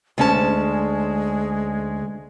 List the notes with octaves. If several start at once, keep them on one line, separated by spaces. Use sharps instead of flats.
D2 G#3 C#4 A5